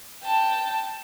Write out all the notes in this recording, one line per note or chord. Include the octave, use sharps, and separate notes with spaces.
G5 A5